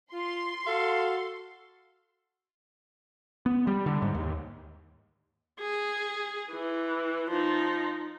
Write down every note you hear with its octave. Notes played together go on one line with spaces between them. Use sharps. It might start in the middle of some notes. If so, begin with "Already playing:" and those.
F4 C6
F#4 A4 F5
B3
G3
D3
G#2
D#2
G#4
E3
F3 D#4